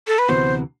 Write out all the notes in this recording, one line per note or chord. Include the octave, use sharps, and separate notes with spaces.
A4
B4
D2 C3 E3 B3 F#4 C5